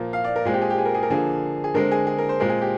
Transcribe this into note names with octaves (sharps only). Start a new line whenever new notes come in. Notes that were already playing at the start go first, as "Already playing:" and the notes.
Already playing: A#2 F3 A#3
F5
D5
A#4
A#2 G#3 C4 G#4
G4
G#4
G4
G#4
A#4
G#4
A#4
D3 F3 A#3 G#4
G#4
D3 G#3 C4 A#4
G#4
G#4
A#4
C5
A#2 G#3 C4 A#4
G#4
G4